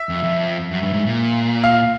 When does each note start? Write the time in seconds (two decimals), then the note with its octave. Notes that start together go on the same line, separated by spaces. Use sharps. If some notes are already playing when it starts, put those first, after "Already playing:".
Already playing: E5
0.09 F2
0.24 F2
0.71 F#2
0.83 G2
0.93 G#2
1.06 A#2
1.64 F5